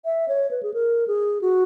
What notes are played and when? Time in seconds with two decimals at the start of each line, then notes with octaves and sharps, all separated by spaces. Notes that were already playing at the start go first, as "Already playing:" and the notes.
0.05 E5
0.28 C#5
0.51 B4
0.63 G#4
0.74 A#4
1.08 G#4
1.42 F#4